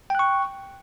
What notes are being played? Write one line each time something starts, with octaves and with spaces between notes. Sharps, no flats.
G5 C#6 F#6